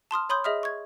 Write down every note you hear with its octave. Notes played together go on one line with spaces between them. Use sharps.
A5 C6 D#6 F6
C#5 B5 C6 D#6 G6
G#4 D#5 E5 D#6 F6
C#6 G#6